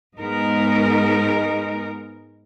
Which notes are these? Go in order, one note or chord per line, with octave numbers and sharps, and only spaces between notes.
G#2 G#3 B3 D#4 A#4